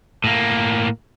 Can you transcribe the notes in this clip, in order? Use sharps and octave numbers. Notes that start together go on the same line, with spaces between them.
A2 A#3